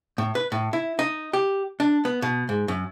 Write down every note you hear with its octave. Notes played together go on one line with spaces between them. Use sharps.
A2
B4
A2
E4
D#4
G4
D4
B3
B2
G#2
F#2